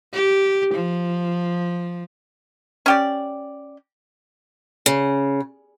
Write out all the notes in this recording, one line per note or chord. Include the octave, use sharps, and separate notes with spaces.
G4
F3
C#4 G4 D5
C#3